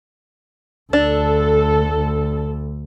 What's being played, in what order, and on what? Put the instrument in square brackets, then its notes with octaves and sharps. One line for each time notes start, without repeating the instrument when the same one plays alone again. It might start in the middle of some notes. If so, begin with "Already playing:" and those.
[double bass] D2 [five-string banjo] D4 [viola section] A4